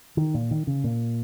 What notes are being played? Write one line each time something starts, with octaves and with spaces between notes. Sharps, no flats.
D#3
A#2
D#3
C#3
A#2